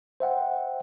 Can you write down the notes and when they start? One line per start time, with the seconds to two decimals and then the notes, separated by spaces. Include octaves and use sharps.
0.20 C5 E5 F#5 G5